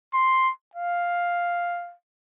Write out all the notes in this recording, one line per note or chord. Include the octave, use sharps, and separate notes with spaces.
C6
F5